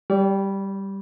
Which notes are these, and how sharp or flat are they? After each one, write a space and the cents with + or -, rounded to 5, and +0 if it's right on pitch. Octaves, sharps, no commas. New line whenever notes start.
G3 +0 D5 -40